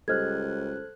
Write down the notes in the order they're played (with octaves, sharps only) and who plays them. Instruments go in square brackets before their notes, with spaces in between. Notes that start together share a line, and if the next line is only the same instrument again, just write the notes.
[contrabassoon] C#2 [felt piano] G3 D#5 [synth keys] A4 C5 F#6 [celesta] F6 G#6